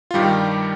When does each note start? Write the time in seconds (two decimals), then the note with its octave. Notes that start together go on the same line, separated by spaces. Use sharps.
0.11 F4
0.14 G2 D#3 G3 G4